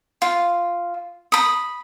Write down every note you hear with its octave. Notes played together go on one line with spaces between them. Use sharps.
F4
B5 D#6